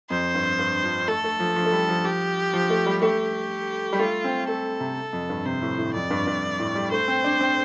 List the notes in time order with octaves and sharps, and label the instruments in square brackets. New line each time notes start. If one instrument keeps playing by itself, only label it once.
[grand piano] F2 [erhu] C5
[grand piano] G2
G2
F3
[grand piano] A3 [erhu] A4
[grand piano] A3
F3
F3
A3
G3
F3
[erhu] G4
[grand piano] F3
A3
G3
[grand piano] A3 [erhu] G4
[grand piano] G3
[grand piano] A3 [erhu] F4
[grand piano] C4
[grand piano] A3 [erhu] A4
[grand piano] C3
F2
G2
[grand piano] C3 [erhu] C5
[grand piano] A2
A2
[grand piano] F2 [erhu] D5
[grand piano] G2
G2
A2
G3
[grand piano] A3 [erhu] C5
[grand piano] C4
D4
C4